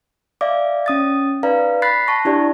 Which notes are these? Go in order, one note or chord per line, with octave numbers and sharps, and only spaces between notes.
D5 E5 F5 D6
C#4 D#6 A6
D#4 B4 D5 F5 A#5
B5 F#6 A6 B6 C7
A5 C#6 A#6
D4 E4 G4 D5